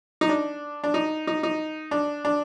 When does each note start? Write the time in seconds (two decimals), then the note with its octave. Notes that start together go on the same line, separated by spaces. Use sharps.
0.21 D#4
0.29 D4
0.84 D4
0.94 D#4
1.27 D#4
1.43 D#4
1.91 D4
2.25 D4